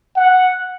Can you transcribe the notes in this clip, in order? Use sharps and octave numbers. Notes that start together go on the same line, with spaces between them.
F#5